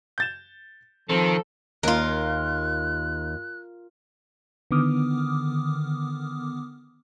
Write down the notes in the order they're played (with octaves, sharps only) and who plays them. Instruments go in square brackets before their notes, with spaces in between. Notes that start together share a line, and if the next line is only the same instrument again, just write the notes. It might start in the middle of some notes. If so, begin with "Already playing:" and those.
[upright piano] G6 A6 E7
[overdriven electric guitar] D#3 [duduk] F3 [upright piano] C4 [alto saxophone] A4
[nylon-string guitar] D#2 [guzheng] F4 A#4 [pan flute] F#6
[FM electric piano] D3 D#3 B3 D6 D#6 F6